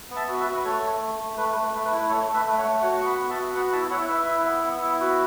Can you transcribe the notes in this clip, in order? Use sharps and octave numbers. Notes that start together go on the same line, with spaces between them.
B3
E5 A5
F#4
B4 E5
F#4
B4
A3 A4 C#5
A3
A3
A3
A3 B4
A3
B4
A3
B4
E4
A3 A4 C#5
A3
B4 E5
A3
C#5 F#5
A3
F#4 C#5 F#5
B3 C#6
F#5 B5
B3
E5 A5
F#4
B3 F#5 B5
E4 E5 A5
E4 C#5 F#5
E4 B4 E5
E4
B3
B3
E4
F#4 B4